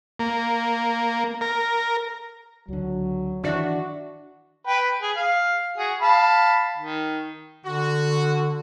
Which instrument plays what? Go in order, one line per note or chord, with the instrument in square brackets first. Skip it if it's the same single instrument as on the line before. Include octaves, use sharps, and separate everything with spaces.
[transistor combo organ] A#3
A#4
[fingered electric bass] C#2 D3 [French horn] F#3
[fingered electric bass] D#3 E3 [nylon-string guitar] D4 D5 E5 [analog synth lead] F#4
[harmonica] B4 G5
G#4
F5
F#4 G#4
F5 A5 B5
D#3
[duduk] D3 [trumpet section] F#4